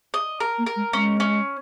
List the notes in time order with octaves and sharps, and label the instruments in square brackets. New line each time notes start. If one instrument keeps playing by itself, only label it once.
[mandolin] D#5
A#4
[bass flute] A#3
[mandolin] A#4
[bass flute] G#3
[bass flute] G#3 [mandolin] C#4
[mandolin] C#4